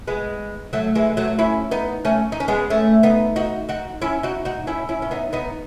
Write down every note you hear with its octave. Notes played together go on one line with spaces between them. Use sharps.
G#3 B3
F#3 A3
E3 G#3
F#3 A3
C#4 E4
B3 D#4
A3 C#4
D#4
C#4
G#3 B3
A3 C#4
B3 D#4
D#4 F#4
D#4 F#4
C#4 E4
D#4 F#4
D#4 F#4
C#4 E4
C#4 E4
C#4
B3 D#4
B3 D#4